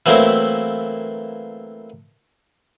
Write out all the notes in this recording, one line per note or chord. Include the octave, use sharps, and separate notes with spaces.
E3 F#3 A3 A#3 C4 E4